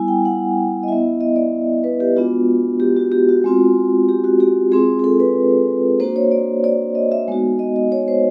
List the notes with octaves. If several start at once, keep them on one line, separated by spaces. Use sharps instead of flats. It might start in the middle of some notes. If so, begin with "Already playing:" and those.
Already playing: G3 B3 E4 G#5
G5
F#5
D#5
B3 E4 E5
D#5
D5
B4
G4
G#3 B3 D4 F4 F#4
G4
F#4
G4
F#4
G#3 C4 F4
G4
F#4
G4
G#3 C4 F4 G#4
G#4
A4
B4
A#3 D4 F#4 C5
C#5
D5
D5
D#5
E5
G#3 B3 D#4 F#4
D#5
D#5
C#5
C5